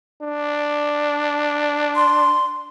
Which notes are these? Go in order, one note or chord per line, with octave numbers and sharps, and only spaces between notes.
D4
C6